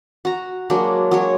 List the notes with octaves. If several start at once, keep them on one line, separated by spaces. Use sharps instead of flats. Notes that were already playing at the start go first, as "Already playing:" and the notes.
F#4 A#5
F#3 G#3 A#3 D4
F#3 G#3 C#5